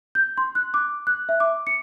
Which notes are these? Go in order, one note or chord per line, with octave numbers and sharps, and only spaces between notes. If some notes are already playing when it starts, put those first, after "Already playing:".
G6
C6
F#6
D6
F#6
E5
D6
C#7